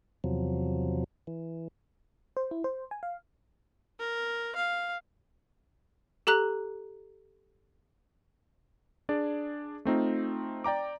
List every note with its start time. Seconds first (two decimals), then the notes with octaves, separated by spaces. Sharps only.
0.24 E2 C3 F3 F#3
1.27 E3
2.37 C5
2.51 E4
2.64 C5
2.91 G#5
3.03 F5
4.00 A#4
4.56 F5
6.27 G4 A4 A#5 F#6
9.09 D4 G#4 D5
9.85 A3 C4 D#4 F4
10.64 D5 G5 A#5 D6